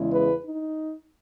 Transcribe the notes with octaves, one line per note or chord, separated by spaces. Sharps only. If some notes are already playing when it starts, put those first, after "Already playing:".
Already playing: E2 C#3 E3 G#3
B4
D#4